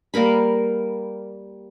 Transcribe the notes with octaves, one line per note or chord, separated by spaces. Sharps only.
G3 A#3 A#4 B5